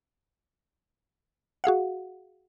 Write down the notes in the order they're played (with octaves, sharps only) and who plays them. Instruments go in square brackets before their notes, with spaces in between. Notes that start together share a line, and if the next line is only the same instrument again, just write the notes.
[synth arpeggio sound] F#4 G#4 F5 F#5